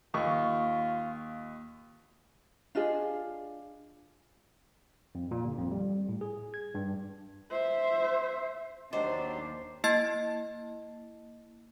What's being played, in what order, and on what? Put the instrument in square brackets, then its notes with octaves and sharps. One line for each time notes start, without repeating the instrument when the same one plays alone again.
[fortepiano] D#2 [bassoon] F4 [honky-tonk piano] C#6
[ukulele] D4 F4 G#4 D#5
[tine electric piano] F2
A#2
G1
F2
G3
A2
G#4
G#6
G2
[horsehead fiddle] C5 E5
[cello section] D#2 D4 [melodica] F#3 G4 C6 [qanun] C5 [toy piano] D#5 F#5
[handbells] A#3 E4 D#5 A5 A6